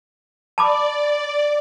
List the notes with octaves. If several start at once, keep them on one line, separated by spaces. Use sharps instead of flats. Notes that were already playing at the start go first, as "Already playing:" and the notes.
D5 A5 B5 D6